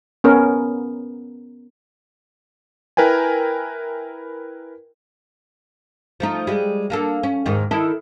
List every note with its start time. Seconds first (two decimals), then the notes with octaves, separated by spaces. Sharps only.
0.24 B3 C#4 A#4
2.97 E4 A#4 B4 G5 G#5
6.20 F3 A3 D#4
6.47 G3 G#3
6.90 A#3 D4 A4
7.23 C#4
7.46 D#2 G#2 D#3
7.71 D#3 E4 A4